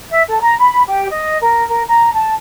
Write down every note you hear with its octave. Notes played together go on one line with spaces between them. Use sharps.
E5
A4
A#5
B5
G4
D#5
A#4
A#4
A#5
A5